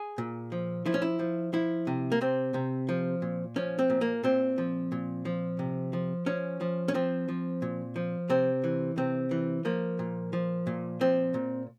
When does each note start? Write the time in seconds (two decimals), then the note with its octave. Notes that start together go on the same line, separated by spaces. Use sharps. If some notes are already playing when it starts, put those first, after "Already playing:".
Already playing: G#4
0.18 A#2
0.52 F3
0.86 F3 E4
0.94 C#4
1.02 E4
1.19 F3
1.53 F3 E4
1.87 C3
2.12 A#3
2.21 C3 C4
2.54 C3
2.89 F3
3.22 A#2
3.56 F3 C#4
3.79 C4
3.90 A#2
4.01 A#3
4.24 A#2 C4
4.58 F3
4.92 A#2
5.25 F3
5.59 C3
5.93 F3
6.26 F3 C#4
6.61 F3
6.88 C#4
6.94 F3 C4
7.29 F3
7.62 A#2
7.96 F3
8.29 C3 C4
8.64 E3
8.97 C3 C4
9.31 E3
9.65 F3 A#3
9.99 A#2
10.33 F3
10.67 A#2
11.01 F3 C4
11.34 A#2